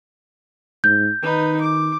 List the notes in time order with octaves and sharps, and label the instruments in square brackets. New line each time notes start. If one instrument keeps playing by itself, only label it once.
[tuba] G#2 [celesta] G6
[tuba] D#3 [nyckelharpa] D#4 B4
[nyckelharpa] D6